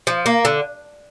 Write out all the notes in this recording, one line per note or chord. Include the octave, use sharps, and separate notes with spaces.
F3
A#3
D3